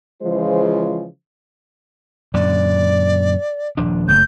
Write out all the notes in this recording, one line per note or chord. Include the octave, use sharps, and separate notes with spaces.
C#3 E3 F3 G#3 F4 C5
F#2 A#2 D3 D5
D#1 F3 D4
F#1 A3 G6